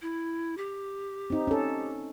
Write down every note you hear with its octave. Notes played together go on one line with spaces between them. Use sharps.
E4
G4
C4 D#4
C#4 A4